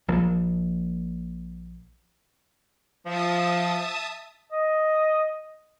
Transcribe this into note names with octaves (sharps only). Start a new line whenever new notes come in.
A#1 F3 A#3
F3 E5 A5 D#6
D#5